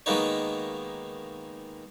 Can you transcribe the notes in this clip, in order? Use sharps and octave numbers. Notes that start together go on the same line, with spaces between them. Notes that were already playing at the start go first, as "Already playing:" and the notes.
D#3 G#3 A#3 B3 D#4 C#5